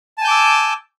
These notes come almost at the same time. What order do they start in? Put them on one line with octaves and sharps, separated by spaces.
A5 G#5 G6 D6 E6